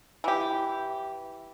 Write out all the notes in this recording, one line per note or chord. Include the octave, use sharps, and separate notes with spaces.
E3 G4